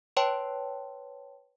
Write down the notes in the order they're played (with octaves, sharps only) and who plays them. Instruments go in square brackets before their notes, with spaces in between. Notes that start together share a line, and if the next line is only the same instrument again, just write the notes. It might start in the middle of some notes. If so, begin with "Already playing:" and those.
[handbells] B4 C#5 G5 A5 C6